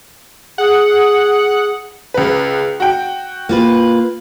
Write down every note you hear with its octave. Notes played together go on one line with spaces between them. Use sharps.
G#4 F#5
C#2 B4
F#4 G5
A#3 F4 B4